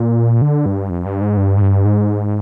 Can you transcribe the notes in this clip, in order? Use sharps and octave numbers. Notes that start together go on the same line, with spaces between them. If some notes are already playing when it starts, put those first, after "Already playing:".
Already playing: A#2
D3
G2
F2
G2
G#2
G2
G#2
G2
G#2